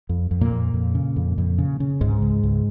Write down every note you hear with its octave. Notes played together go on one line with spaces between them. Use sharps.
F2
F2
A#2 A#3
F2
F2
C#3
F2
F2
C#3
C#3
C#2 G#2 G#3
C#2
C#2